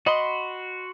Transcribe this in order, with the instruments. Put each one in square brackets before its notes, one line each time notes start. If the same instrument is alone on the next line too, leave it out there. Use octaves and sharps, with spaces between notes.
[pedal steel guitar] F#4 B5 C6 [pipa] D#5